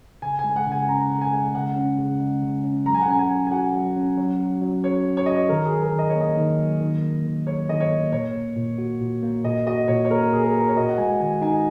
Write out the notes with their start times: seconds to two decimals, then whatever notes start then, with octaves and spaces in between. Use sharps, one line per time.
0.22 C#3 G#5
0.39 G#5
0.44 G#3
0.56 F#5
0.67 C#3 G#5
0.88 C#4 A#5
1.10 C#3
1.21 G#5
1.33 G#3
1.54 C#3 F#5
1.76 C#4
1.98 C#3
2.20 G#3
2.42 C#3
2.64 C#4
2.86 F#3 A#5
2.94 G#5
3.01 F#5
3.08 C#4 G#5
3.19 G#5
3.30 F#3
3.47 G#5
3.51 F#4 F#5
3.74 F#3
3.96 C#4
4.18 F#3
4.39 F#4
4.62 F#3
4.83 C#4 C#5
5.06 F#3
5.17 C#5
5.26 F#4 D#5
5.36 C#5
5.49 D#3 A#4
5.65 G#4
5.72 F#3
5.83 A#4
5.93 D#3
5.99 D#5
6.09 C#5
6.15 A#3
6.21 D#5
6.37 D#3
6.59 F#3
6.81 D#3
7.03 A#3
7.25 D#3
7.47 F#3 C#5
7.69 D#3 D#5
7.80 C#5
7.91 A#3
8.12 A#2 C#5
8.35 A#3
8.56 A#2
8.78 F#4
9.00 A#2
9.23 A#3
9.44 A#2 D#5
9.66 F#4 D#5
9.88 A#2 C#5
10.05 C#5
10.10 A#3 A#4
10.33 A#2 G#4
10.43 A#4
10.54 F#4
10.59 A#4
10.68 C#5
10.76 F#4 D#5
10.89 F#5
10.98 G#3 G#5
11.20 D#3 G#5
11.42 D#4 G#5